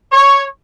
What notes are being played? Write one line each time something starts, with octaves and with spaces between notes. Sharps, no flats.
C#5